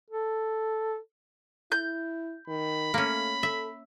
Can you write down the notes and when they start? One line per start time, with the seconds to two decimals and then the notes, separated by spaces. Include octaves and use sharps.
0.11 A4
1.72 E4 G6
2.48 D#3 B5
2.94 A3 A#3 C#4
3.43 A4 E5